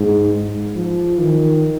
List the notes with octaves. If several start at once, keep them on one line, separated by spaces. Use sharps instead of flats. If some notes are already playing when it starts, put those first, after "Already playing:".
Already playing: G#2
F3
D#3